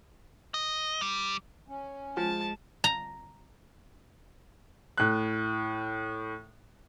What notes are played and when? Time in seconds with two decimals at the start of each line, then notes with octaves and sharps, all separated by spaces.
0.54 D#5
1.01 G3
1.68 C#4
2.17 F3 G#3 A5
2.84 A#5
4.98 A2 F#6